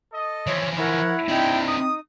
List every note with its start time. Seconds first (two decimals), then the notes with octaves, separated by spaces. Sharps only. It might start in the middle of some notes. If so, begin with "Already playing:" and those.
0.12 A4 D#5
0.47 E3 F3 C#5
0.78 E4 A#4 C#5 F#5
1.29 C3 D4 D#4 G#4 G5
1.66 D#6